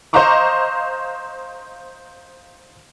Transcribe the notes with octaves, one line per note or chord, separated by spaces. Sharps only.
C5 D#5 F5 A#5 C#6 D6